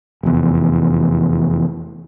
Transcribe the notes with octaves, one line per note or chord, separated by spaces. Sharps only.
F1 E2